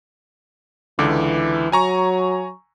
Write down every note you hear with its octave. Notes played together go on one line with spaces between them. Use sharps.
C#2 D3 E3 D6
F#3 G#5 A#5 C#6